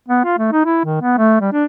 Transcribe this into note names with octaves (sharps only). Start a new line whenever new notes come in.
B3
F4
A3
D#4
E4
D#3
B3
A3
G3
D4